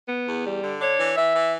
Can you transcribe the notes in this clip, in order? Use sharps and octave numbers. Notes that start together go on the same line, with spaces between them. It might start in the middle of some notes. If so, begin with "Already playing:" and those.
B3
E2
G3
D3
D4 C#5
E3
E3 E5
E3